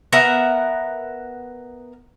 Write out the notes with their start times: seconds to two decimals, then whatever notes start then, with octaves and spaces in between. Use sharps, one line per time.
0.13 B3 A#4 E5 F#5